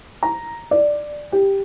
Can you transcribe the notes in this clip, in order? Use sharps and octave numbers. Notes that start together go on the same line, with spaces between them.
A#5
D5
G4